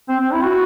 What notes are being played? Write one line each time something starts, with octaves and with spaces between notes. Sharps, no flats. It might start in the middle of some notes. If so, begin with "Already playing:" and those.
C4
C4
E4
F#4